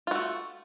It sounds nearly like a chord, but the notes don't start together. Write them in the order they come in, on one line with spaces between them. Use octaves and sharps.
F4 F#4 A3